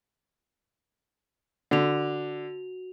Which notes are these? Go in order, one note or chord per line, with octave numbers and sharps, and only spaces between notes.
D3 F#4 F7